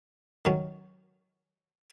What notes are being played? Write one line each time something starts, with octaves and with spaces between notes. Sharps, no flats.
D#3 F#3 C#4